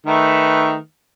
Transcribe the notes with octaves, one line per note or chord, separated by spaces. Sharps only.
D#3 A3 B4